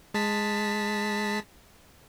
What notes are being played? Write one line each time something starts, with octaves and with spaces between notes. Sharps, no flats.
G#3 A5 B6